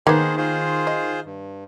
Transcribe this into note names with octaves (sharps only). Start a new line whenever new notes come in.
D#3 A#3 B3 G#4 C5
F4 G#4 C5
D#5
G2